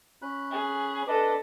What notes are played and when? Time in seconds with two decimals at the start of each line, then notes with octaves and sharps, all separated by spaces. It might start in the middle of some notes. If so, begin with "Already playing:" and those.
0.22 C#4 B5 F#6
0.51 G#4
1.07 D4 A4 B4 D#5 D6